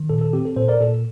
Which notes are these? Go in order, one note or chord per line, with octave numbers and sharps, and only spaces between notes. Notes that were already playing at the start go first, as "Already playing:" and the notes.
Already playing: D#3
A#2 A4
A4
C4 G4
A4
A#2 A4 C5
A#4 D5
A#2 A4